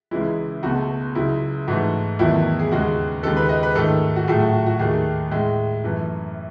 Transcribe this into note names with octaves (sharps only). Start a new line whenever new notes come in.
C#2 C#3 E3 G#3 E4
C#2 B2 A3 F#4
C#2 C#3 F#3 E4
G#2 E3 A3 F#4
E2 D#3 F#3 A3 E4
G#4
D#2 C#3 G#3 F#4
D#2 C#3 G#3 A4
B4
D#5
B4
G#2 D#3 A3 A4
F#4
A2 F#3 A3 G#4
F#4
F#4
F#4
D#2 D#3 A3 G#4
A2 G#3
F#2 E3 A3